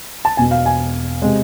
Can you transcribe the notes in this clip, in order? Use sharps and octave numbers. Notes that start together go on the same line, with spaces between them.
A5
E1 E2 B2 G#5
F5
G#5
C3 G#3